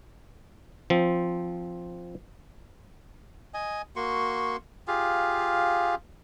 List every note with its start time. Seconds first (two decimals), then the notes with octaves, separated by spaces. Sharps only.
0.90 F3 C4
3.54 D#5 G#5
3.96 A#3 F#4 C6 C#6
4.88 F4 G4 G#4 F5